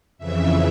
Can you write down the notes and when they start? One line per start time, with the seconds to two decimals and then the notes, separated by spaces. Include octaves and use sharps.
0.18 F2 C#3 E3 E5